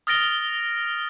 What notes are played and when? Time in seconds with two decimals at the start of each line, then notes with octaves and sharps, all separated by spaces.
0.07 D#6 F6 A6 A#6 D7 G7